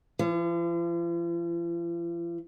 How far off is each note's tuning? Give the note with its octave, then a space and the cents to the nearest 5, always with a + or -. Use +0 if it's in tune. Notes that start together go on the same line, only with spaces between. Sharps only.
F3 -45